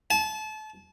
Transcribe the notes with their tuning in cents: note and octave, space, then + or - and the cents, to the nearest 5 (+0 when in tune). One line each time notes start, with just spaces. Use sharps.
A5 -30